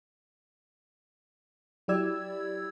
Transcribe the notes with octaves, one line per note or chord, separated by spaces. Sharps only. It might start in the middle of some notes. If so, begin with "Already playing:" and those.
F#3 E4 G4 D5 E6 G#6